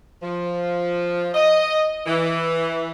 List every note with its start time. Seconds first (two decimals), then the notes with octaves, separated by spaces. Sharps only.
0.22 F3
1.35 D#5
2.07 E3